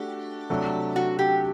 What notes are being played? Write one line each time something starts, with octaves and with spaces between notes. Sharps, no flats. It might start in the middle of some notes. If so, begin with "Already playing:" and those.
Already playing: A3 D4 F#4 G4
C3 F#3 A3 D4
F#4
G4